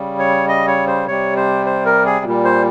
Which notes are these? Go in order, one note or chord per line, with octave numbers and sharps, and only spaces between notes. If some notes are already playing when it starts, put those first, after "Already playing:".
Already playing: C#3 G3
C#5
D#5
C#5
C5
C3 G3 C#5
C5
C5
A#4
G#4
A#2 G3
C5